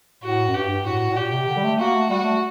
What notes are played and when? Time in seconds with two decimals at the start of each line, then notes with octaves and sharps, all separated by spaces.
0.23 A2 F#4
0.48 F#2
0.54 G2 G4
0.69 G2
0.85 A2 F#4
1.10 A2
1.16 A#2 G4
1.32 C3
1.48 D3
1.57 G3
1.64 A3
1.79 A#3 F#4
1.95 A3
2.10 G3 F#4
2.23 A3